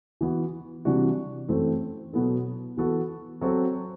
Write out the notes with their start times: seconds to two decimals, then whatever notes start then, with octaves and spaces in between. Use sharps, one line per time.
0.21 E3 B3 F#4
0.85 C3 E3 G3 D4 F#4
1.49 F#2 E3 A3 C4
2.13 B2 F#3 B3 E4 A4
2.77 E3 B3 F#4 A4
3.41 F#3 C4 F#4 A4